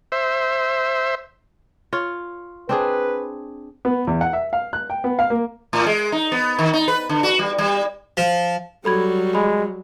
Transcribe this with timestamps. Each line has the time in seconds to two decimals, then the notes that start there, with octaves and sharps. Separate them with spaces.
0.12 C5 E5
1.93 F4 C#5
2.69 C4 D4 G#4 B4
3.85 B3
4.07 E2
4.21 F#5
4.33 E5
4.53 F5
4.73 F#6
4.90 G5
5.04 B3
5.19 F5
5.30 A#3
5.73 A2
5.86 G#3
6.12 D#4
6.32 B3
6.59 D#3
6.73 D#4
6.88 B4
7.09 D3
7.23 F#4
7.39 G3
7.58 G3
8.17 F3
8.85 F#3 G3 A4 B5 G#6
9.35 G#3 B5